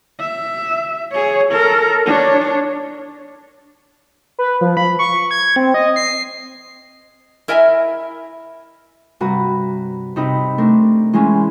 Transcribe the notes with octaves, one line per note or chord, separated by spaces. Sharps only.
E5
G#4 C#5
A4 A#4
D4 C#5
B4
F3
B5
C#6
G#6
C4
D#5
C7
E4 A#4 D#5 E5 G#5
G2 C3 F#4 B4 A#5
C3 D#4 G4 B4
A3 C4 D4 A#4
E3 G#3 C4 C#4